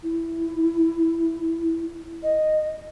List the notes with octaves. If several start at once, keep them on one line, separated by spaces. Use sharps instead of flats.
E4
D#5